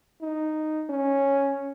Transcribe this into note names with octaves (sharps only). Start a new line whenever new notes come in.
D#4
C#4